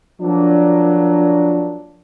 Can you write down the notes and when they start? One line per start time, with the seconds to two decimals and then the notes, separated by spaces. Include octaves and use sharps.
0.21 F3 F#3 A#3 D4